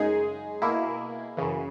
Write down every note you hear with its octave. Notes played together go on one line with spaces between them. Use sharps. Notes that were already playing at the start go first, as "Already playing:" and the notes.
Already playing: F#2 C#3 G#3 D#4 G#4
B2 A#3 E4
F#2 C#3 E3